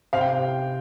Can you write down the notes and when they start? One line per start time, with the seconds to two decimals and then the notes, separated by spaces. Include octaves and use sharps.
0.13 C3 C5 F5
0.21 G5